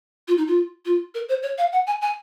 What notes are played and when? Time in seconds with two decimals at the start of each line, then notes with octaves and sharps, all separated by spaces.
0.28 F4
0.38 D#4
0.48 F4
0.85 F4
1.15 A#4
1.29 C5
1.43 C#5
1.58 F5
1.72 F#5
1.87 G#5
2.02 G#5